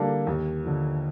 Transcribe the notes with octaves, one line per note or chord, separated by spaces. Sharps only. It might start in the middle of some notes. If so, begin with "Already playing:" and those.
Already playing: D3 G3 A#3 D4 A4
D#2
D3 F3